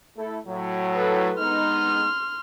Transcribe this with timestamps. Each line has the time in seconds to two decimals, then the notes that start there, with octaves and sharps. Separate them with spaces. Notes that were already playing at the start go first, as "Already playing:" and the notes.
0.16 A3 E4 A4
0.47 A2 F#3
0.95 A4 B4
1.39 G#3 B3 D#4 C6 F6